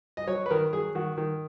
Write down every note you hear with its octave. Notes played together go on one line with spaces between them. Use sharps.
D#5
F#3 C#5
B4
D#3 A#4
F#3 G#4
D#3 F#4
D#3